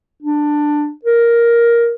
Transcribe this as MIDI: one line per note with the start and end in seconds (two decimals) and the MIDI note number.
0.22 0.91 62
1.05 1.93 70